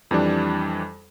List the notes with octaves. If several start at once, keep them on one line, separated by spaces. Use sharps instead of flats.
F2 E3 G3 D4